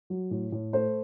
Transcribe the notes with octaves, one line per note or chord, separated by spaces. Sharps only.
F#3
A2
A2
A3 C5